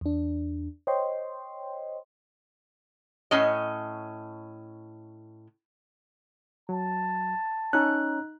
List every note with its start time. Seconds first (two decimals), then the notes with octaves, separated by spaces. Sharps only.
0.01 E2 D4
0.87 C5 C#5 D#5 G5 C6
3.31 A2 C#4 D#5
6.69 F#3 A5
7.73 C#4 D#4 F#6